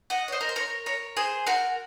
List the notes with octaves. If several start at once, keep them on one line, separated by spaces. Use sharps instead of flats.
D#5 F#5
C#5
C5 D#5
A#4
C5
A#4 C#5
A#4 C#5
G#4 C5
F#4 A#4